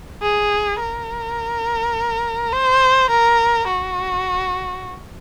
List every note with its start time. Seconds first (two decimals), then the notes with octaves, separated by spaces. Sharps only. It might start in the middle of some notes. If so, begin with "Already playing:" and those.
0.22 G#4
0.80 A#4
2.53 C5
3.10 A#4
3.67 F#4